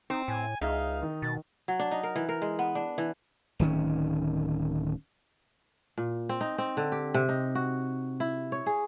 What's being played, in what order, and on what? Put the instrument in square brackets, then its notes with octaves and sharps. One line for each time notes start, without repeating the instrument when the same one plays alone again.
[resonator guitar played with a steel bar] C4 [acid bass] D#4
[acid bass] A2 [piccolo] G#5
[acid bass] C#2 [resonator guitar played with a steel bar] D#4 [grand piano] G#4 E5 [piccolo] F5
[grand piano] D#3
[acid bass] B2 [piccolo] A6
[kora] F#3
D4
D#4
A#4
E3
A#4
G#3
B3
D4
E3
[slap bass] D1 D#3 C#4
[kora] A#2
C4
D#4
C4
D3
G4
C3
D#4
F#4
E4
C#5
G#4